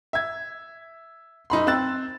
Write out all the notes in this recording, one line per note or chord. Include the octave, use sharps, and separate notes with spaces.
E5 G#6
F#2 D#4 B5 C6
C4 E6 F#6 A6